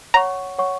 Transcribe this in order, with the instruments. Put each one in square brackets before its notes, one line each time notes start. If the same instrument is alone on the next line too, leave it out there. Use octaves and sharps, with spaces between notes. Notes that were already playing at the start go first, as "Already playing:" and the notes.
[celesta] C#5 F#5 C#6 [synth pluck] A#5
[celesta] C#5 F#5 C#6